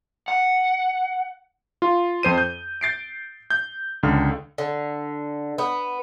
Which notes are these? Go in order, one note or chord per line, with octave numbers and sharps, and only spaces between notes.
F#5
F4
F2 C5 D#7
G6
G6 A6 C7 D7
G6
C#2 D3 F6
D3
B3